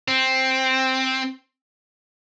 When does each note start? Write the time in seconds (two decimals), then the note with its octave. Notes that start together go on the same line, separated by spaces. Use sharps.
0.08 C4